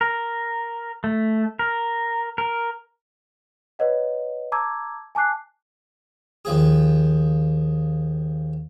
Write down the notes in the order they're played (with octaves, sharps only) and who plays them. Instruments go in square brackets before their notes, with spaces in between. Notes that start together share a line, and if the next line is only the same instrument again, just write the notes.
[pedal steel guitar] A#4
A3
A#4
A#4
[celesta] B4 C#5 D#5 F#5
A5 A#5 D6 E6 G#6
G#5 A5 D6 F#6 C7
[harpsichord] D#2 F3 G#4